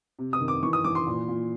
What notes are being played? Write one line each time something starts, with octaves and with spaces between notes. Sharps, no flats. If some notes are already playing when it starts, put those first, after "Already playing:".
C3
D#6
D#3
D6
E3 C#6
D#6
E3 D6
C6
A#2
A#2